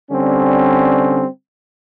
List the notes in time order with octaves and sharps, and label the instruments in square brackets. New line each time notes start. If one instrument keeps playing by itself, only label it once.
[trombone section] D3 G3 C4 C#4